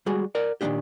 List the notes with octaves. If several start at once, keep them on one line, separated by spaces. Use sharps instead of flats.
G3 G#3 F#4 G#4
A#4 D5 F#5
A#2 D#3 A#3 C4 D4 G4